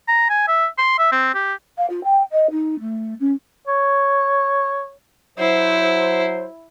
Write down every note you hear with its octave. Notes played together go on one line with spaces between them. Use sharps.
A#5
G#5
E5
C6
E5
C4
G4
F5
F4
G5
D#5
D#4
A3
C#4
C#5
F#3 E4 C5